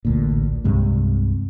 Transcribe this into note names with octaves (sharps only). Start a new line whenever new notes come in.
A1 D2 A#2
C2 G2 C3 G#3